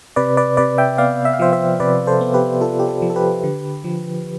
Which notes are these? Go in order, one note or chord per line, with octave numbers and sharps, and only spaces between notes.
C3 B4 D5
B4 D5
C3 B4 D5
E5 G5
B3 D5 F5
E5
F5
F3 C5 E5
C5 E5
C3 B4 D5
A4 C5
B3
G4 B4
F4 A4
G4
A4
F3
A4
G4 B4
D3
F3